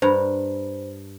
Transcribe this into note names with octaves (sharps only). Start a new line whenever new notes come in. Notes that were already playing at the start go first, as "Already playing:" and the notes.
G2 C5 A#5